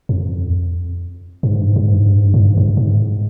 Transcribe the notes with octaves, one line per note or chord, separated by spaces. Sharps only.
F2
G2
G#2
G2
G#2
G2
G#2
G2
G#2
G2
G#2
G2
G#2
G2
G#2
G2
G#2